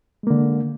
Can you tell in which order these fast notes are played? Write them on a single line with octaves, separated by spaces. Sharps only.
G#3 A#3 D3